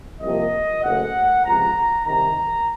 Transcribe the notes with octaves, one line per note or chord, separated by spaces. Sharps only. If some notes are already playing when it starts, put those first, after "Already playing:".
C2 C3 F3 A#3 D#5
F#1 F#2 C#3 A3 F#5
C#2 C3 F3 A#5
C2 C3 D#3 A#5